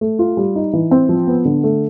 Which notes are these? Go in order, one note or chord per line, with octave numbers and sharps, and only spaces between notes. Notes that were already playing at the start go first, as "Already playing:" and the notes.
A3
F4
G3
D#4
E3
C4
F3
B3
D3
A3